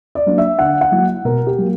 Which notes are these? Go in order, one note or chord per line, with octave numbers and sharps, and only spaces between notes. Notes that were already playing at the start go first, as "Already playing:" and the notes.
D5
F#3 A#3 D4
E5
D3 F#5
F#5
F#3 A#3 E4
B2 A#4
G4
F#3 A#3